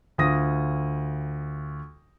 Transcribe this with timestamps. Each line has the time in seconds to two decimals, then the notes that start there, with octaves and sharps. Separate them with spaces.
0.18 D2 F4 D#6 A#6